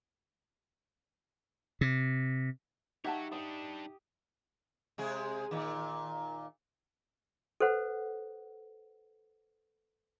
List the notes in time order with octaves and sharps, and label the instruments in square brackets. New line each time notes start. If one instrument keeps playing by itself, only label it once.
[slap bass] C3
[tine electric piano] D#4 [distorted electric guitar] F#4 C#5 [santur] G4 [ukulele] E5 F#5 A5
[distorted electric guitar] G3 D4 [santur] D#6
[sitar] C3 G#3 G#4
A#2 D#3
[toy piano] A4 B4 C5 F#5